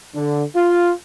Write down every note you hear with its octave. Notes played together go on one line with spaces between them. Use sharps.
D3
F4